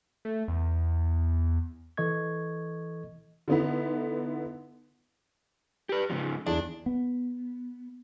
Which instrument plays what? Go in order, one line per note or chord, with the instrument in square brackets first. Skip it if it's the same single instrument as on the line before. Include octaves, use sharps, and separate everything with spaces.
[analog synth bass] A3
E2
[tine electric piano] E3 A4 D#5 C#6 G#6
[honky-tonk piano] D3 E3 B3 D#4 E4
[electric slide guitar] G4 B4
G#2 C#3 F3
[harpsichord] E2 [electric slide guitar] D4
[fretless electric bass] B3